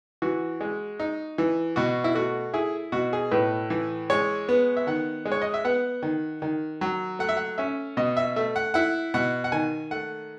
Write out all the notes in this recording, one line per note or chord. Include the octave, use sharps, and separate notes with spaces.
E3 F#4
G#3
D#4
E3
B2 F#4
E4
A3 F#4
E4 G#4
B2 F#4
G#4
A2 B4
E3
G#3 C#5
B3
E5
D#3 F#5
G#3
C#5
D#5
E5
B3 F#5
D#3
D#3
F#3
A3 F#5
E5
F#5
C#4 E5
B2 D#5
E5
A3 E5
F#5
E4 F#5
B2 F#5
F#5
D#3 G#5
A3 F#5